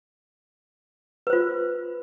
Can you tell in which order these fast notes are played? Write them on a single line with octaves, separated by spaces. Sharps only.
B4 C5 F4